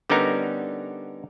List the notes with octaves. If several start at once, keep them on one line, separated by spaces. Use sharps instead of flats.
D3 G3 B3 C#4 D#4 A#4